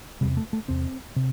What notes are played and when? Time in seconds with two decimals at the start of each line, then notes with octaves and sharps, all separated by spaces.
0.21 E2 C3 G3
0.37 A3
0.53 A3
0.68 E2 C3 C4
1.16 C3